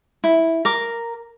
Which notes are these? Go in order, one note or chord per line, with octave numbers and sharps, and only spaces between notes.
E4
A#4 D6